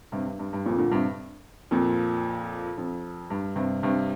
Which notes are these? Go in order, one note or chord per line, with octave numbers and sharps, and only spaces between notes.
G2 C3
G2
G2
G2
F2 A#2
A#2 D3
G2 C3
F2 A#2
F2
G2
G2 C3
G2 C3